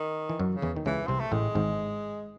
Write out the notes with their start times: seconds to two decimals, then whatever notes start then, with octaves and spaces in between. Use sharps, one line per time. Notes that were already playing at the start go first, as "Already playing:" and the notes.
Already playing: D#3
0.29 E3
0.40 F#2 F#3
0.55 C#3
0.62 E2 E3
0.76 D#3
0.86 C#2 C#3 E3
1.07 C2 C3 C4
1.20 A3
1.32 A1 A2 G#3
1.55 G#1 G#2